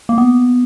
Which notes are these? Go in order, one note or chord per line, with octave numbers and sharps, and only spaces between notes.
A#3
B3